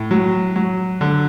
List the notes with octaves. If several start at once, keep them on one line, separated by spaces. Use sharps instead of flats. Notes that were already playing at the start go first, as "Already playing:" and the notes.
Already playing: A2
F#3
F#3
D3